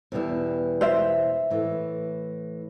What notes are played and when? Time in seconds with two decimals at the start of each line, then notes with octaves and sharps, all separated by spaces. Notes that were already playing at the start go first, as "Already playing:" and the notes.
0.12 E2 B2 G3 B3 E4
0.81 C5 E5
1.50 A2 E3 A3